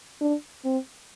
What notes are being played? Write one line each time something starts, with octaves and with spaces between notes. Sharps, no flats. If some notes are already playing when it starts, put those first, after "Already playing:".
D4
C4